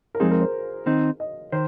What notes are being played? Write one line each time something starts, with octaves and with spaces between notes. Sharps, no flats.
A#4
F2 F3 G#3 C4 D#4 G#4
A#4
C5
D#3 C4 D#4
D#5
D#3 C5